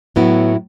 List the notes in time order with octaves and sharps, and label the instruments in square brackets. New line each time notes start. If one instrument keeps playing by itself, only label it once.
[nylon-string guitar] A2 F#3 B3 E4